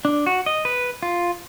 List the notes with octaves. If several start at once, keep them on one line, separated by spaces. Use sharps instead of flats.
D4
F#4
D#5
B4
F4